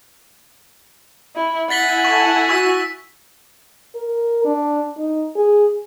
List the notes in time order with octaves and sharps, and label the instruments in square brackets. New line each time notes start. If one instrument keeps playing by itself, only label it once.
[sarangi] E4
[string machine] E4 E5 G#5 [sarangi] F#5 [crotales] A6 B6 G7
[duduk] A4 [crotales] C#6
[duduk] F#4 [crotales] C#6 E6 B6
[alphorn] A#4
D4
D#4
G#4